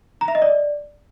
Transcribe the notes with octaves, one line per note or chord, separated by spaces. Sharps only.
A#5
E5
D#5
D5